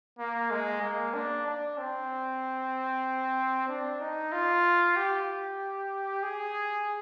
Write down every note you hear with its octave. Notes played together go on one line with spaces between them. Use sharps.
A#3
G#3
A#3
D4
D4
C4
D4
D#4
F4
G4
G#4